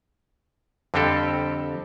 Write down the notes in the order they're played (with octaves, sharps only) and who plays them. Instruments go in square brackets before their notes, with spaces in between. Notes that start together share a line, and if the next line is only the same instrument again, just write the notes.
[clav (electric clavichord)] F2 D3 G3 C4 G4 A4